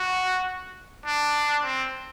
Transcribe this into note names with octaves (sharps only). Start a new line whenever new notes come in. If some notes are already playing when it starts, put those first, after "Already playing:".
Already playing: F#4
D4
C4